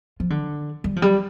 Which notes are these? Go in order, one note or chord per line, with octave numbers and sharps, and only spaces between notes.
F3
D3
G3
F3
G3